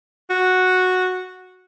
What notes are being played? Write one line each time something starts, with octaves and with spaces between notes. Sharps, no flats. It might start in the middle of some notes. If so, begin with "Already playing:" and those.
F#4